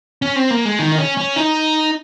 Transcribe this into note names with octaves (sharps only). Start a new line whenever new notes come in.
C#4
C4
A#3
G#3
D#3
D#4
C#4
C#4
D#4